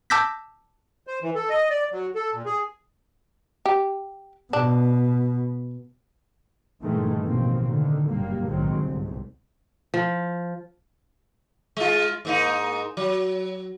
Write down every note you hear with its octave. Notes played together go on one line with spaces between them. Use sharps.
A5 D6 E6 G6 A#6 B6
C5
E3
A4
D#5
D5
F#3
A4
A#2
G#4
G4
B2 D4
G2 A#2 D#3 E3 G#3 A3
A1 B2 D#3 F3 A#3 C4
D3 D#3
F#1 G2 A#2 G3 A#3
B1 A2 D#3 F#3 G#3 C4
G1 C2 G#2
F3
G#3 F4
G#2 A#3 D#4
F#3